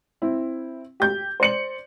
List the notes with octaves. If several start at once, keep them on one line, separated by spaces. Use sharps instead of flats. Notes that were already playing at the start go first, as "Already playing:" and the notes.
C4 E4
G4 G6
C5 D5 C#7 F#7